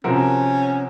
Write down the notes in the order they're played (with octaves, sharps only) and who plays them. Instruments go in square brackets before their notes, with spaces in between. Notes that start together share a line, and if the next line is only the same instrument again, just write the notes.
[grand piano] C3 F3 C4 F#4 A#4 [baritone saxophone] C#4